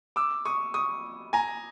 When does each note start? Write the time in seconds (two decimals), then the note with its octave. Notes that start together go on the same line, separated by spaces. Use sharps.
0.16 D6 E6
0.45 C#6 D#6
0.74 C#6 D#6
1.33 G#5 A#5